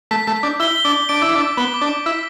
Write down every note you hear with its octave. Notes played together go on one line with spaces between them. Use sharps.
A3 B6
A3 B6
D4 G6
E4 G7
G7
D4
G7
D4 D7
E4 D6
D4
D7
B3 G7
D6
D4
D7
E4 B6